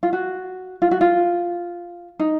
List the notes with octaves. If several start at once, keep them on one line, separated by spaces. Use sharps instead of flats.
F4
F#4
F4
F#4
F4
D#4